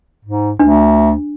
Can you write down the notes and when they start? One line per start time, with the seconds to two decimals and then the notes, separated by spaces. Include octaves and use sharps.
0.25 G#2
0.59 D2 D4